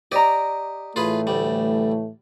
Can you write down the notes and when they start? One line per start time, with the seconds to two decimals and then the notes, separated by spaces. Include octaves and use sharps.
0.12 G4 D5 D#5 A#5
0.96 A2 E3 A3 F4 G#4 B4
1.27 D2 G3